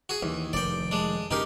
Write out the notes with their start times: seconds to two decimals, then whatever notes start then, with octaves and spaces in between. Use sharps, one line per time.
0.09 F#4 G#4
0.23 D#2 E3
0.53 F1 D#3 D5 G5
0.91 G#3 D4
1.31 F#2 C#3 D#4 G4 A#4